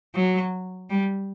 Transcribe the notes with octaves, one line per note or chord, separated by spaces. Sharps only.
F#3
G3